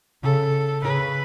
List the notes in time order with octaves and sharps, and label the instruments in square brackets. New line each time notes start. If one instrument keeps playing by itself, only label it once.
[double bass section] C#3 [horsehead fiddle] A4
[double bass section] C#3 [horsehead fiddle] B4